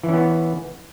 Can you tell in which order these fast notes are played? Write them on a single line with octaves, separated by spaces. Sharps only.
E3 C#4 B3